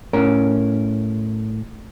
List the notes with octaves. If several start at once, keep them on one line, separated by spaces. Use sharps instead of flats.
A2 C#4 A#4